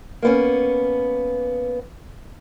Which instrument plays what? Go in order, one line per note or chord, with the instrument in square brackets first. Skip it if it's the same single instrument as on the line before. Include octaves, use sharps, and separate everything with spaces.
[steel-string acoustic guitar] A#3 B3 C#4